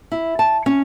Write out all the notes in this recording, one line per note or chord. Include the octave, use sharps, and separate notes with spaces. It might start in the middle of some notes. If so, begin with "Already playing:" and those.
E4
A5
C#4